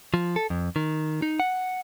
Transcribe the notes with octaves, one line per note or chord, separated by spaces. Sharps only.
F3
A4
F2
D#3
D#4
F#5